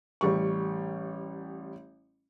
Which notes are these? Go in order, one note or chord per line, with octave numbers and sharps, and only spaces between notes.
A1 G3 C#6